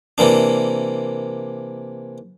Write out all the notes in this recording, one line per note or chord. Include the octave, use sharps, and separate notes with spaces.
C3 E3 A#3 D4